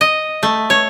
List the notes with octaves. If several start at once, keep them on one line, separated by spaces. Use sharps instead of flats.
D#5
A3
C#5